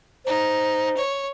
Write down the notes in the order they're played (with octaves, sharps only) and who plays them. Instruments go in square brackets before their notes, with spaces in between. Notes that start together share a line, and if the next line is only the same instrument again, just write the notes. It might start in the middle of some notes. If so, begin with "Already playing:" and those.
[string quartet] D#4 [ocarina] C5
[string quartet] C#5